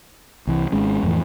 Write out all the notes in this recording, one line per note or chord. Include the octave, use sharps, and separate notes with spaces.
C2 E3
G#1 G#3 C#4
F2 A2 E3